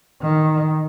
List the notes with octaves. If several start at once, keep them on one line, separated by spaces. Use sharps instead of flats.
D#3